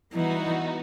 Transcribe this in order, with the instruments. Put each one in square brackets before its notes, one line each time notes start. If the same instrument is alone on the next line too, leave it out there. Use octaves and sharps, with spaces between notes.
[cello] E3 [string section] G3 B3 D#4 F#4